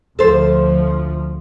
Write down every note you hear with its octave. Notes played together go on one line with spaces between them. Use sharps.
D2 F3 A4 C5